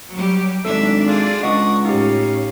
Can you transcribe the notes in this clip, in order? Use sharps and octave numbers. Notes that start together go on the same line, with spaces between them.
F#3 G3 G4
G#1 D4 A4 E5
F4 G#4 D5
C#2 D#5 F#5 C#6 D#6
A2 C#4 D#4 G4 F5